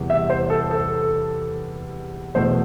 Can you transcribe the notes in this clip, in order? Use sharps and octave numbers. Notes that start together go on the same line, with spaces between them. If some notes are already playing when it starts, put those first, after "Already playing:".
Already playing: E2 C3 G3 B3
E5
C5
A4
A4
E2 B2 A3 C5